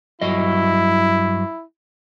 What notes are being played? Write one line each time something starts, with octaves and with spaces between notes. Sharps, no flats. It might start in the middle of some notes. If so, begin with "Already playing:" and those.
G2 F#3 E4 D#5